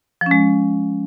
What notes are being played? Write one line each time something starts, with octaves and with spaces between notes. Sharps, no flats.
F3
C#4
G#3